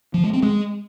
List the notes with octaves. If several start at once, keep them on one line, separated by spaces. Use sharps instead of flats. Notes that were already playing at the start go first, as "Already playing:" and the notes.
F3
G#3
C4
G#3